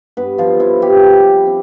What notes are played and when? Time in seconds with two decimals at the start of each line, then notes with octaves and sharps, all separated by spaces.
0.17 G2 B3 B4
0.38 F3 F4
0.60 F3 E4
0.82 G3 G4
1.03 C4
1.46 C4